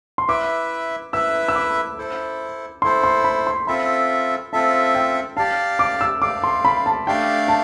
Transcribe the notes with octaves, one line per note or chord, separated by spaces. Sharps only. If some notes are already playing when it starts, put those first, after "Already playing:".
C6
E4 B4 E5 D6
E4 B4 E5 E6
E6
D6
E4 A4 C5
E4 A4 C5 C6
C6
B5
C6
C4 F4 A4 E5 B5
C4 F4 A4 E5 A5
G5
G4 D5 F5 A5
D6
E6
G4 D5 F5 D6
C6
B5
A5
A3 D4 G4 D5 F5 G5
A5